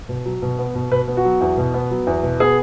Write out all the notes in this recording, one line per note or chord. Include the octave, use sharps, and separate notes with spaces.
B2
F#3
B2
B3
B2
B2 B4
B3
F#4
F#3
E2
B2
B3
F#3
E2
B2
B3 G#4